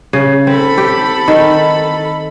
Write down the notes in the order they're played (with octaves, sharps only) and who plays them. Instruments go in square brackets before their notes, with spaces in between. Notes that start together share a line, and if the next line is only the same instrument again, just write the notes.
[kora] C#3
[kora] C4 [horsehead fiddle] A4 B5
[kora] G4
D#3